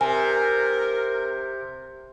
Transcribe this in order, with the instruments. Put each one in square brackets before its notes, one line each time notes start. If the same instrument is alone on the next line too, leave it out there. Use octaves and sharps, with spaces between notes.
[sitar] C3 [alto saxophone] A#4 [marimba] G#5